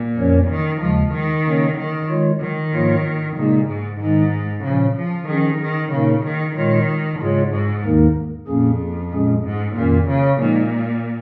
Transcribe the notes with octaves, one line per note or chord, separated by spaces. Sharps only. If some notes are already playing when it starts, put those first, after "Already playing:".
Already playing: A#2
F2 F3 C#4 A#4 C#5
D#3
D#2 C#3 F3 G#3
D#3
C#3 A#3 C#4 A#4 C#5
D#3
D#3 G#3 F4 C#5
D#3
G#2 F3 A#3 F4 C#5
A#2 C#3 G#3 D#4 G#4
G#2
G#2 D#3 G#3 D#4
A#2 C#3 F3 C#4
F3
D#3 F3 C#4 G#4
D#3
A#2 C#3 A#3 D#4 A#4
D#3
A#2 D#3 G#3 F4 C#5
G#2 C#3 G#3 F4 G#4 C#5
G#2
D#2 D#3 A#3 D#4 A#4
F2 A#2 A#3 C#4 G#4
A#2 G#3 C#4 G#4
G#2
F2 A#2 D#3 C#4 F4 A#4
C#3
A#2 F3 G#3 D#4